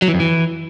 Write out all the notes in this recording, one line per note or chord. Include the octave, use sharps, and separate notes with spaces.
F#3
E3
F2
E3